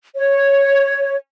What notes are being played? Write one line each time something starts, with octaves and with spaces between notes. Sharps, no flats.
C#5